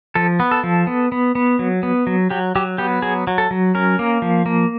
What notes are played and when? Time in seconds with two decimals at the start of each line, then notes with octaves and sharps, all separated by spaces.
0.15 F3 A4
0.40 B3
0.51 A4
0.64 F3
0.87 B3
1.12 B3
1.35 B3
1.59 F#3
1.83 B3
2.07 F#3
2.30 F#3 G4
2.56 F#3 G4
2.78 B3 G4
3.02 F#3 G#4
3.27 F#3
3.38 A4
3.51 F#3
3.75 C#4 A#4
3.99 A#3
4.22 F3
4.46 A#3